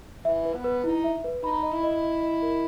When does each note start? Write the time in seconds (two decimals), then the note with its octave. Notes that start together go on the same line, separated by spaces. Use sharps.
0.25 E3 E5
0.45 B4
0.54 B3
0.64 B4
0.84 D#4 E4
1.04 E5
1.24 B4
1.43 D#4 B5
1.63 D#5
1.72 E4
1.83 D#5
2.03 D#5
2.22 D#5
2.42 A#4